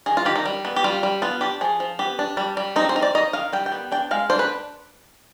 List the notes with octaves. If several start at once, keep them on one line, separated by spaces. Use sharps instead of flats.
D#3 G#4
F4
D#3 G4
D#4
G3
B3
G4
G3 F4
G3
B3 F4
D4 G4
F3 G#4
F3
B3 G4
D4
G3
G3
C4 D#4
C5
D#4
D5
D#4 D#5
D#3 F5
G3 G5
G5
B3
D4 G5
G#3 F5
D4 C5
B4